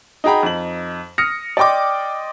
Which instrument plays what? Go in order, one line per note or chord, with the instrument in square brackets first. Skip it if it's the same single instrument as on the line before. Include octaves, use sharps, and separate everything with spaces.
[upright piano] D#4 F#4 G#4 G5 A#5 B5
F2 D#4 F#7
D#6 F6 A#6 C#7
D5 D#5 G5 C6 D6